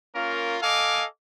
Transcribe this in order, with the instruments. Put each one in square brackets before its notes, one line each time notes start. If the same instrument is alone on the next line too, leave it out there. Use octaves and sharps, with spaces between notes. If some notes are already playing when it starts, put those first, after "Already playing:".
[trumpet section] A#3 C#4 F4 A#4
A4 D#5 F5 G#5 D6